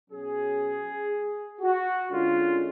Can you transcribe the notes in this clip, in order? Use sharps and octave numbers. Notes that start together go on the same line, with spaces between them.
B2 F#3 C#4 G#4
F#4
D3 G#3 C#4 F4